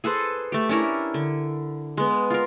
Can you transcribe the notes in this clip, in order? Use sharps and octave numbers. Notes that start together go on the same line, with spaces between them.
G#4 A4 B4 C5
A3 G4
C#4 D4 E4 A#4
D3
G#3 B3
F4 A#4